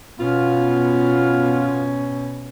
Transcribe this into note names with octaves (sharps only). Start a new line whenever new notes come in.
B2 B3 C#4 F4